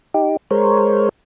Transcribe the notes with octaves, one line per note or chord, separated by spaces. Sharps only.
D#4 G4
G#3 A#4 C5 C#5